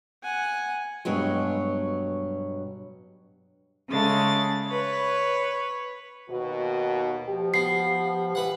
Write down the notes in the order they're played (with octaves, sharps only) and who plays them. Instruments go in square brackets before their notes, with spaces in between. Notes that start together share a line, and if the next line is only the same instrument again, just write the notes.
[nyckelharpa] F#5 G#5
[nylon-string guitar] G2 B2 F#3 G#3
[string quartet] C#3 G#3 A3 A6
B4 C#5
[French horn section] D#2 B2 F#4
[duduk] F3 [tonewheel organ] G4
[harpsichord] B3 [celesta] C7
[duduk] E3 [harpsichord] B4 F#5